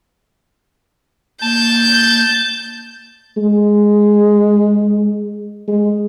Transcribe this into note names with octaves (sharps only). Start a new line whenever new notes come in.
A#3 A5 G6
G#3
G#3